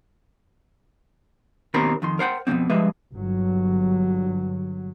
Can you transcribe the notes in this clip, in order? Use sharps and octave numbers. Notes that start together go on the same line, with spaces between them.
D#2 B2 D#3 C4 A#4 B5
F2 D#3 C6
A#4 C5 F#5 G5
F2 B2 D3 A#3 C4
G2 F3 G#3 B4 E5
G1 F#3